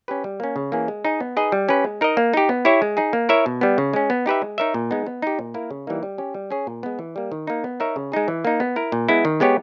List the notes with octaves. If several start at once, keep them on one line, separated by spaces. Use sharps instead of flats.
C#4 G4 B4
G3
A#3 C#4
C#3
E3 A#3 C#4 G#4
G#3
D#4 G#4 D#5
B3
D#4 G#4 B4 D#5
G3
C#4 G4 B4
G#3
D#4 A#4 D#5
A#3
D#4 G4
B3
E4 G4 C#5 E5
G#3
D#4 G#4
A#3
E4 A#4 C#5 E5
B2
G3 B3
C#3
G#3 C#4
B3
D#4 G4 B4 E5
G#3
D#4 A#4 C#5 E5
A#2
G#3 B3 D#4
B3
D#4 G4
A#2
A#3 E4 A#4
C#3
E3 G3 A#3 D#4
G3
C#4 G4
G3
C#4 G#4 C#5
A#2
G#3 B3
E3
G3 A#3
D#3
A#3 D#4
B3
D#4 A#4 C#5 E5
C#3
G#3 D#4 G#4
E3
A#3 D#4
B3
E4 A#4
A#2
G#3 B3 E4
D#3
G#3 B3 G4 C#5